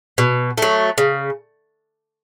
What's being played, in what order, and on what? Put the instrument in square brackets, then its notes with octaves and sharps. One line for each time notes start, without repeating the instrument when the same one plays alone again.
[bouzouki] B2
F#3 A3
C#3